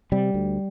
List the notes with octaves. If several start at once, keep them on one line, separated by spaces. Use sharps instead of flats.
C3 G3
D2